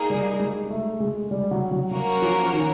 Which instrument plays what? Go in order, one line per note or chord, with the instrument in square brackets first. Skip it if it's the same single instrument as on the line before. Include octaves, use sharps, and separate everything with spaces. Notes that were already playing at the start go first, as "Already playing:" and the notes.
Already playing: [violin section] A#3 D#4 G#4
[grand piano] G3
G#3
A3
G#3
G3
F#3
F#3
[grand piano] F#3 [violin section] A#3 C#4 F#4 A#4 C#5
[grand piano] F3
D#3